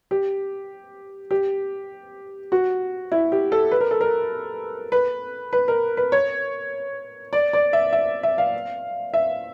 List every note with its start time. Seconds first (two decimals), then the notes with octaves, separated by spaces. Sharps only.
0.11 G4
1.31 G4
2.52 F#4
3.12 E4
3.32 G4
3.52 A4
3.72 B4
3.81 A#4
3.91 A4
4.01 A#4
4.92 B4
5.53 B4
5.68 A#4
5.97 B4
6.12 C#5
7.33 D5
7.53 D5
7.73 E5
7.93 E5
8.23 E5
8.38 F5
9.14 E5